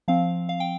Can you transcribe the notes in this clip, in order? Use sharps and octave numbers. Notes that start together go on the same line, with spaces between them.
F3 C4 F5
F5
G5